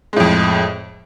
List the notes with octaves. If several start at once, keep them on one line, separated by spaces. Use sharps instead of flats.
F2 A2 G#3